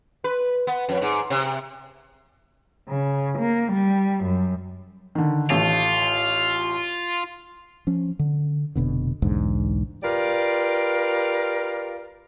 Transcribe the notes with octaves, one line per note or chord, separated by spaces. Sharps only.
B4
B3
F2
G#2
C3
C#3
A#3
G3
F#2
D3 D#3
A1 A3 F4
F3 C#4
D3
F1 B2 D3
B1 E2 G#2 D3
F4 G4 A#4 B4 D5